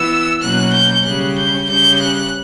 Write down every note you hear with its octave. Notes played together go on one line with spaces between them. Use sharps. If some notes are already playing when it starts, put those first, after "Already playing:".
Already playing: E3 B3 E6
B2 F#3 A#3 C#4 F#6
G6
C#3 G3 C#4 F#6
G6
C#3 G3 C#4 G6
F#6